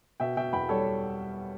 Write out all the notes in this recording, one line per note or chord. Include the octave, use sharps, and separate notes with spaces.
B2 E5 G5
B2 E5 G5
E2 G5 B5
G3 A4 C#5
C#5